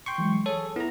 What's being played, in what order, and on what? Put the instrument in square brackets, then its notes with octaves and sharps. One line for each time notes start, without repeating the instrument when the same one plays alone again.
[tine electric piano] G5 C6 C#6
[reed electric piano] E3 F#3 G#3
[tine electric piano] G#4 A4 [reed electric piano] C#5
[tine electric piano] B3 A#5 [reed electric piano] E4